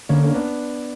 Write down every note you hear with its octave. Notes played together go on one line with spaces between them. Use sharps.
D3 A#3 C#4
A#3 C#4
B3 D4